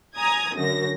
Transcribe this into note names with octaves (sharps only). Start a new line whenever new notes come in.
G#5 A#5 D#6 G#6
F#2 D3 A#6